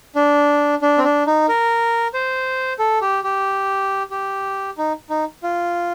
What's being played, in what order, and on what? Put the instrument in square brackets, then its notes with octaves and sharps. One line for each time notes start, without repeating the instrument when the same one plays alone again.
[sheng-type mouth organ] D4
D4
C4
D4
D#4
A#4
C5
A4
G4
G4
G4
D#4
D#4
F4